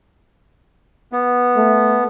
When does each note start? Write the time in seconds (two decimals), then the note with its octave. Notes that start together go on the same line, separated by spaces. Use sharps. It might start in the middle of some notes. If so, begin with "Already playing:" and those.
1.12 B3
1.56 A3